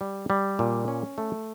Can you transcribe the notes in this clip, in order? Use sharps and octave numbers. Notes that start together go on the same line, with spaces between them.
G3
G3
A#2
C#4
A3